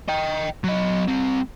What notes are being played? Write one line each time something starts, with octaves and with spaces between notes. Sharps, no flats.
D#5 G5
F#3 D#5
G3 C4